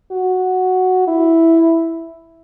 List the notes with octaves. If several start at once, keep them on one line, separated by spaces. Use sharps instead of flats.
F#4
E4